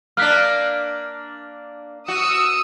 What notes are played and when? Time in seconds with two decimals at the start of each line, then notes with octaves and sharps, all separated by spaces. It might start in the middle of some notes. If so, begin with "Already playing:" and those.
0.17 A#3 D4 F6 F#6 B6
2.08 F#4 D#6 E6 C#7